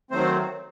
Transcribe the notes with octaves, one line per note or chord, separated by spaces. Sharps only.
D#3 F#3 A3 C4 C5